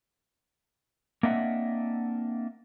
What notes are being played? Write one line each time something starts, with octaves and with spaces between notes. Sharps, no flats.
A#3 C4 D4 D#5 E5 F#5